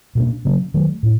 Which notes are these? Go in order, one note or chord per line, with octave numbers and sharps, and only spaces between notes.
B2 G3 A#3 D4
C#3 F#3 A#3 C#4
D#3 F#3 A3
A2